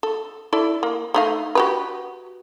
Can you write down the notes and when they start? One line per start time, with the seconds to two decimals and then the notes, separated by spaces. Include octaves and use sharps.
0.03 A4
0.53 E4 A4 D5
0.83 A#3
1.14 A3 D#4 F5
1.55 F#4 G4 B4